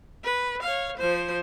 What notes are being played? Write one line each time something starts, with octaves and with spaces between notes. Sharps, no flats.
B4
C#5 F5
F3 C5